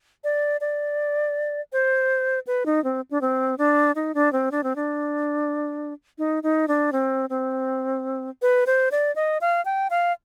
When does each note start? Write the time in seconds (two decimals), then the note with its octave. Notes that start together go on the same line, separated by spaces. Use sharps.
0.24 D5
0.61 D5
1.73 C5
2.47 B4
2.66 D#4
2.84 C4
3.11 D4
3.21 C4
3.58 D4
3.95 D#4
4.15 D4
4.33 C4
4.51 D4
4.63 C4
4.76 D4
6.18 D#4
6.43 D#4
6.68 D4
6.92 C4
7.30 C4
8.42 B4
8.67 C5
8.92 D5
9.16 D#5
9.41 F5
9.65 G5
9.90 F5